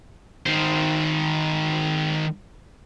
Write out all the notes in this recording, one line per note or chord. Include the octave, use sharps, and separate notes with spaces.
D#3 C5